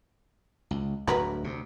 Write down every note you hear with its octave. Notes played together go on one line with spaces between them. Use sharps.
C#2
D1 D2 G2 F#4 A#4 B4
D2 C3